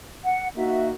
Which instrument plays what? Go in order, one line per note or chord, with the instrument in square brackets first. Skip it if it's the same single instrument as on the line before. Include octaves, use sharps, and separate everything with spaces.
[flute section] F#5
[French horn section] A#3 D#4 F#4 [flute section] E5